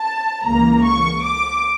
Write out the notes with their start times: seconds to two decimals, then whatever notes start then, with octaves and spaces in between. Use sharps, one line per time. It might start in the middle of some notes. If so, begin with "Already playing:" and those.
Already playing: A5
0.45 C#2 C#3 E3 A#3 A#5
0.85 C#6
1.24 D6